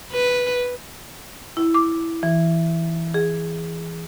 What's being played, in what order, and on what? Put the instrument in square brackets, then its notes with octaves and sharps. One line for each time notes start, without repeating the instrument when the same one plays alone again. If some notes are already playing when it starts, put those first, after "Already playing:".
[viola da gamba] B4
[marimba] E4
D6
E3
G#4